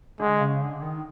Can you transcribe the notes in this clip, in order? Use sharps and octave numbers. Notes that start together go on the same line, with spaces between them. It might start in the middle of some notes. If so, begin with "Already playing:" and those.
D3 G#3
C#3
D3
D#3